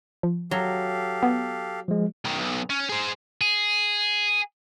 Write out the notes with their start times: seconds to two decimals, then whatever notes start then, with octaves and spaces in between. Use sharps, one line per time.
0.23 F3
0.51 F#3 G4 A4 F5
1.23 B3
1.88 F3 G#3
2.24 B1 D#3
2.38 B1
2.70 C#4
2.89 G#4 C5
3.41 G#4